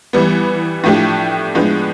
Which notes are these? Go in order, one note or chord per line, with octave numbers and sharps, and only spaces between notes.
E3 G3 B3
A2 F3 A3 D4 G4
A2 F3 G#3 B3 D4